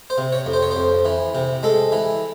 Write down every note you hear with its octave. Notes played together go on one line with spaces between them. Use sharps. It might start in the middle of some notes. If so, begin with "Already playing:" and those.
C5
C3
C#5
F2
C5
C#5
C5
F2
E3
C3
G#3 A4
E3